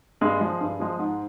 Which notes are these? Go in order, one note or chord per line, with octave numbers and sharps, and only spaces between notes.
G2 G#3 G#4
F3 G#3
G2
F3 G#3
G#2